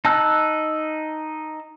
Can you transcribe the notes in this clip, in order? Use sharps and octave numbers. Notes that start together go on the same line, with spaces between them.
D#4 A5 E6 F#6